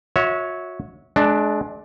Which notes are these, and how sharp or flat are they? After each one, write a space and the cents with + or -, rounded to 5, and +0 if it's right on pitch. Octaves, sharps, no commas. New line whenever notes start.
F#4 -35 C#5 +0 E5 -25
G#3 +35 D4 +5